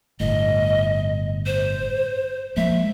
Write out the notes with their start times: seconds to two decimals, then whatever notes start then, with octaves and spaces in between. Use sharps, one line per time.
0.20 G1 A2 D#5
1.46 C5
2.57 F3 G#3 A#3 E5